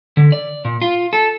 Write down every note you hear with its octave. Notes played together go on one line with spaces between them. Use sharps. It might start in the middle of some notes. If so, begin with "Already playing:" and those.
D3
D5
A#2
F4
A4